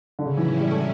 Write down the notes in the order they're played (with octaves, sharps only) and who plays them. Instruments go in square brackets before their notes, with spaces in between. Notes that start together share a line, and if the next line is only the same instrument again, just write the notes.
[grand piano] D3
[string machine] A2 F#3 C#4 E4 [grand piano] C#3
[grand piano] E3
E3
G3
A3